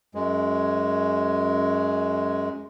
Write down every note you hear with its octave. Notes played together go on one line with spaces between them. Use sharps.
F#2 G#3